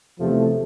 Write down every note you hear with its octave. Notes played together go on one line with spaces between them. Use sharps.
E2 C3 F3 A3